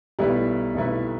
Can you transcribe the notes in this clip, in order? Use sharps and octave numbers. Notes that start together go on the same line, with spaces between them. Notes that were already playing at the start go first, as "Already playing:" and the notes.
B1 B2 G3 A3 E4 B4
B1 B2 A3 E4 B4